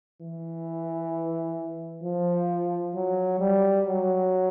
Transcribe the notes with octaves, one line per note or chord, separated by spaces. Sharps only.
E3
F3
F#3
G3
F#3